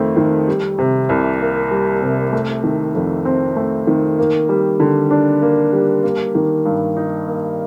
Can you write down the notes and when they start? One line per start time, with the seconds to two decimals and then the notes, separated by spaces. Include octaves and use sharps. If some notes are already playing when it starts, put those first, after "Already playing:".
Already playing: F2 D#3 A3 C4
0.17 D#3
0.48 G3
0.79 C3
1.09 C2
1.41 A#3
1.71 G3
2.02 C3
2.33 A3
2.64 D#3
2.95 F2
3.25 C4
3.56 A3
3.87 D#3
4.18 A#3
4.49 G3
4.80 D3
5.11 D4
5.42 A#3
5.73 G3
6.03 A#3
6.35 D#3
6.65 G2
6.97 D#4
7.27 A#3